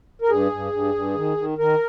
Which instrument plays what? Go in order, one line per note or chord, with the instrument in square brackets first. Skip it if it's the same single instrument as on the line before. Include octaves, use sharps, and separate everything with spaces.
[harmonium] A#4
G2 G#4
G2
G2
G2
D#3
D#3
D#3 A#4